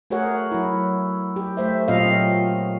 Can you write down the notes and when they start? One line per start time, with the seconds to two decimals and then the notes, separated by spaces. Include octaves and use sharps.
0.10 A3 F#4 G#4 A#4 C#5 F#5
0.52 F#3 E4
1.36 G4
1.57 A3 C5 E5
1.88 A#2 F#3 A3 C4 D#5 F5